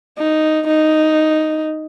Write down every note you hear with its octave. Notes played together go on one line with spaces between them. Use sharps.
D#4
D#4